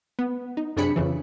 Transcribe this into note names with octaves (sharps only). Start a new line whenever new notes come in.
B3
D#4
F#2 C3 D4 G#4 B5 C#7
F2 C#3 E3